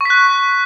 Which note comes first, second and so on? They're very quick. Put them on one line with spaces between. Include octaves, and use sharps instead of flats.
C#6 B6 F#6